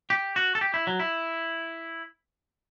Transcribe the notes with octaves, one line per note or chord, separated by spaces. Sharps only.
G4
F#4
A4
G4
E4
F#3
E4